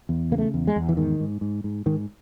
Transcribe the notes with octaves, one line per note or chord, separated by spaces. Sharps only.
E2
C#3 A#3
A3
E2
G#3
E2
E3
G#2 D#3
G#2
G#2
G#2
G#2 D#3